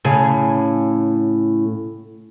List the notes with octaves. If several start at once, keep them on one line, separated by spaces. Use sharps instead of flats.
A2 C#3 G#4